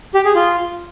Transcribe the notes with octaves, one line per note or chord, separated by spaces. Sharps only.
G4
G#4
F4